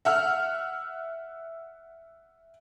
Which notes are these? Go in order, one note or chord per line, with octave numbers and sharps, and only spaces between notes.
E5 F#5 F6